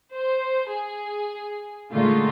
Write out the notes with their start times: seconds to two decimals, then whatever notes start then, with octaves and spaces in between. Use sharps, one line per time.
0.15 C5
0.70 G#4
1.92 A#2 D3 G#3 A3 D#4 F4